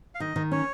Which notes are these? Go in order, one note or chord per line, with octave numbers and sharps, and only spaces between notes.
F5
D#3 D#5
D#3
C#4 C#5